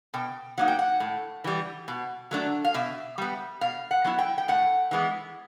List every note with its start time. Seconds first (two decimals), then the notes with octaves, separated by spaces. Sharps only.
0.14 B2 G5
0.58 F#3 A#3 D#4 F#5
0.68 G5
0.79 F#5
1.00 A2
1.44 E3 G3
1.88 B2
2.31 F#3 A3 D4
2.65 F5
2.74 B2 E5
3.18 G3 B3
3.61 B2 F5
3.91 F#5
4.04 F#3 B3 E4
4.19 G5
4.38 G5
4.48 A2 F#5
4.91 E3 G#3 B3